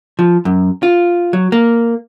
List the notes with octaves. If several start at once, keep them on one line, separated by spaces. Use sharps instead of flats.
F3
F#2
F4
F#3
A#3